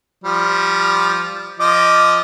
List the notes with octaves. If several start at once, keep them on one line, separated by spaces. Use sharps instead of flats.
F3 G3
F3 D#5 D6